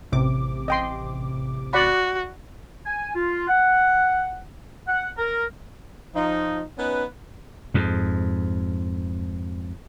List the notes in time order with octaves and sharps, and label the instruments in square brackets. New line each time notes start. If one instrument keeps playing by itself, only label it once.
[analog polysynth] A1 C3 D6
[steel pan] D#5 G5 C6
[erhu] F#4 [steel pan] D5 F#5 B5
[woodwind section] G#5
F4
F#5
F#5
A#4
[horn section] F3 D#4
B3 C#4 D#4 B4
[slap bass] F2 G#2